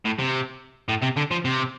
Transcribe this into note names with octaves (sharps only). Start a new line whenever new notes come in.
A2
C3
A2
C3
D3
F3
C3